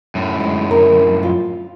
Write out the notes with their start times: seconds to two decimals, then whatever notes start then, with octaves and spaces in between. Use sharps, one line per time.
0.15 F#2 A2
0.40 G#3 D5
0.71 A#4
1.23 F4